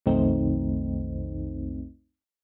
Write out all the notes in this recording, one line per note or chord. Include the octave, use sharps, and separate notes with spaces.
B1 F2 D#3 A3 C4 D#4